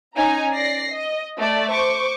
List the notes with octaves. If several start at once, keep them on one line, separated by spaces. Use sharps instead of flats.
C#4 D#4 G#5 A#5
D5 A#6 C7
D#5
A3 D5
C5 C#6 D6